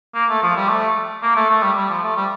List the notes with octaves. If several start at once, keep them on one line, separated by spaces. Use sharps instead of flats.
A#3
A3
F3
G3
A3
A#3
A3
A3
G3
G3
F3
A3
G3